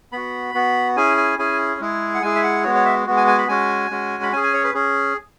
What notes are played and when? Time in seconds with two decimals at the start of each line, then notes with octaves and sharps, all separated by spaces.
0.12 B3 F#4 B5
0.54 B3 F#4
0.96 C#4 E4 G#4 G#5
1.17 G#5
1.39 C#4 E4 G#4 G#5
1.81 G#3 E4 G#4
2.14 F#5
2.22 G#3 E4 G#4 G#5
2.35 E5
2.43 F#5
2.64 G#3 B3 F#4 C#5
2.75 C#5
2.85 E5
3.07 G#3 B3 F#4
3.17 G#5
3.27 G#5
3.38 B5
3.48 G#3 C#4 F#4 G#5
3.90 G#3 C#4 F#4
4.23 B5
4.33 C#4 G#4 G#5
4.43 G#5
4.54 C#5
4.64 B4
4.74 C#4 G#4